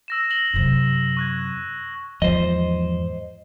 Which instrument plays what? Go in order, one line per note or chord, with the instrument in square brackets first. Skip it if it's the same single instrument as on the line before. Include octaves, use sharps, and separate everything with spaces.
[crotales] E6 A#6 E7
A#6 F#7 G7
[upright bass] F#2 C3
[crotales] C#6 F#6 G#6
[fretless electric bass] E2 G#2 F3 [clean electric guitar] C5 D#5